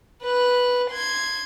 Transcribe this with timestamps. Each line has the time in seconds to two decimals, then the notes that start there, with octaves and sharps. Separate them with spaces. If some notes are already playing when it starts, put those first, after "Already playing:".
0.23 B4 F#6
0.90 C6 G#6